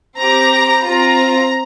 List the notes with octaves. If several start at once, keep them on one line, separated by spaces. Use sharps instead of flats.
C4 G4 A#5
C4 F4 A#5